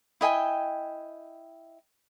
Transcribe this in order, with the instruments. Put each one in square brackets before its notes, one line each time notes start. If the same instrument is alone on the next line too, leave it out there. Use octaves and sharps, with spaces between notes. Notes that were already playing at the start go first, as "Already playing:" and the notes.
[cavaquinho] E4 D#5 G5 G#5